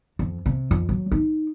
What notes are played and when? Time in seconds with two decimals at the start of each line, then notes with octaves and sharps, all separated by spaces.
0.19 F2
0.46 C3
0.71 F2
0.89 F#3
1.12 D#4